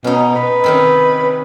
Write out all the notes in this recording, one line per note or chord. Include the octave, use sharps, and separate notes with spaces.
B2 C#4 D#4
B4
C3 D#3 C#4